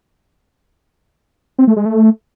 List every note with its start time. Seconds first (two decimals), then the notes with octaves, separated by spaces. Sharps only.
1.59 C4
1.67 A3
1.76 G#3
1.85 A3